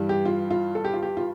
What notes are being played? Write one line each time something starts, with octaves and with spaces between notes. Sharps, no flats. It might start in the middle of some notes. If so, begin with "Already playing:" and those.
Already playing: G2 E3 G3
G4
F4
F4
A4
G4
F4
G4
F4